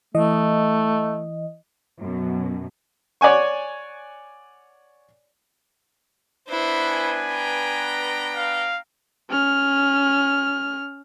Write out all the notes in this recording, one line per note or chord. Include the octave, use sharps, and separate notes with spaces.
E3 A3 D#5
F#2 B2
C#5 D5 F#5 G#5 C#6
B3 D4 E4 B4 C5
G#5
G5 A#5
F5
C#4 F6